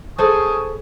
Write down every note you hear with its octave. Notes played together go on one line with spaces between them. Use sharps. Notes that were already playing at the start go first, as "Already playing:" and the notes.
G#4 A4 C5 G#5 C#6 D#6